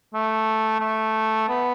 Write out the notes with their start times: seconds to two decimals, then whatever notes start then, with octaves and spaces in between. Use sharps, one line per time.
0.14 A3
0.80 A3
1.48 B3